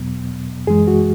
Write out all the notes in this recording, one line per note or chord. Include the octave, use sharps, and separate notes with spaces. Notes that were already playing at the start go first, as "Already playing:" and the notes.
Already playing: E2 B2 F#3 B3
F#2 E3 G#3 G#4
F#4